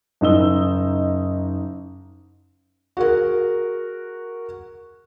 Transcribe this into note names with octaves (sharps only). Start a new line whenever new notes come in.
F#1 D#4 E6 G7
F#4 G#4 A#4